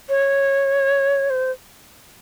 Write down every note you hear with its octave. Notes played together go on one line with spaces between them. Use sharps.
C#5
C5